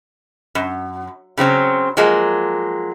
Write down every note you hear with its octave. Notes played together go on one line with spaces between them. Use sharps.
F#2
C#3 F#3 C4 C#4
F3 F#3 G#3 A#3